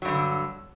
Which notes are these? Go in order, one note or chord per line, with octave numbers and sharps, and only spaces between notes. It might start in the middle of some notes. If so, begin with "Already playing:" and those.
G2 D3 F#3